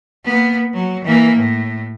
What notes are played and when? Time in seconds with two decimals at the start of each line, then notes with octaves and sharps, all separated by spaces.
0.25 A#3 B3
0.74 F#3
1.05 E3 A#3
1.36 A2